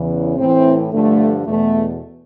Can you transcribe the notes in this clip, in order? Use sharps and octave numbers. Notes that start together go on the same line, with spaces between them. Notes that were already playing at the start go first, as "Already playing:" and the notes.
Already playing: E2 C#3 E3
A2 E3 C4
G2 D3 F3 A3
E2 B2 A3